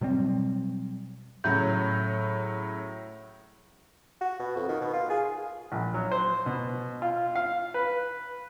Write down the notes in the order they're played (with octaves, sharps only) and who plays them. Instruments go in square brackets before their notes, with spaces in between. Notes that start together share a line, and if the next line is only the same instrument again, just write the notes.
[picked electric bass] B2 F#3 G3 C4
[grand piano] A2 C#3 F#3 [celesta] G6
[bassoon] F#4
B2
F2
D#3
B2
F4
G#4
[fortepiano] A#1
F#3
C5
B2
F4
F5
B4